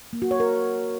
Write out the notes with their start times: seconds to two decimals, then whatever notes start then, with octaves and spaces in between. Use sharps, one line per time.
0.13 A#3
0.22 F#4
0.31 C#5
0.40 A#4